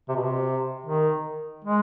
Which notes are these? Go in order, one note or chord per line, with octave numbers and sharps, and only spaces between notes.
C3
B2
C3
D#3
G#3